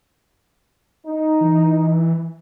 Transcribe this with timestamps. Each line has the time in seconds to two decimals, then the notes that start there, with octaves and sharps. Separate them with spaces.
1.06 D#4
1.41 E3